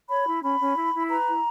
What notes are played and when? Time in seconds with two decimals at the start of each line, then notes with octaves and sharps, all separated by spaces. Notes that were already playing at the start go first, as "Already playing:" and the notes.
0.09 C#5 B5
0.26 E4
0.43 C#4 B5
0.60 C#4
0.76 E4
0.94 E4
1.10 B4 A#5
1.27 E4